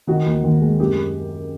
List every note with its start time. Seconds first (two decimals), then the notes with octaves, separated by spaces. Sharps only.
0.07 D#3 F#4
0.26 D#2
0.44 D#2
0.61 G#3
0.80 F#2 G4